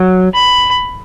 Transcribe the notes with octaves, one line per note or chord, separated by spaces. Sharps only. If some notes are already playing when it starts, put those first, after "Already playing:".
Already playing: F#3
B5